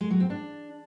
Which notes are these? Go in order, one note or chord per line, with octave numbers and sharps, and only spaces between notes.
G#3
F#3
C4
D4